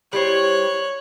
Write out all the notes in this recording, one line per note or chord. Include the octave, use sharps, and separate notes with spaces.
G3 E4 C5 C#5 F#6